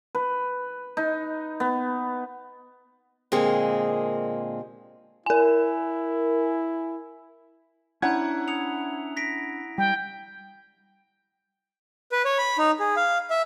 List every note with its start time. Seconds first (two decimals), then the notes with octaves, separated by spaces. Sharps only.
0.15 B4
0.97 D#4
1.60 B3
3.32 A#2 D3 G#3 A#3 C4 G#4
5.26 E4 A#4 G#5
8.02 C#4 D4 E4 F#5 G#5 A#5 G6 G#6
8.48 D#6 C#7 F7
9.17 A#6 B6 D7
9.78 G3 G5
12.12 B4
12.25 C#5
12.38 B5
12.58 D#4
12.80 G#4
12.96 F5
13.30 E5